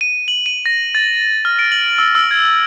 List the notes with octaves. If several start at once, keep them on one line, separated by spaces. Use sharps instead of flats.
D#7
F#7
D#7
A#6
A6
F6
D7
F#7
E6
E6
G#6